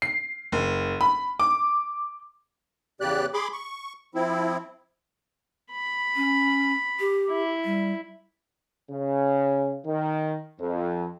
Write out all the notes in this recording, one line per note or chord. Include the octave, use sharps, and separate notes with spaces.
C7
F#1
B5
D6
E2 C#3 G4 D5 F#6
G#4 B5 C6 D6
C#6
F3 C4 E4
B5
C#4
G4
E4
G3
C#3
D#3
F2